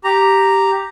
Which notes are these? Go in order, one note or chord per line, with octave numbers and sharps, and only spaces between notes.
G4 A#5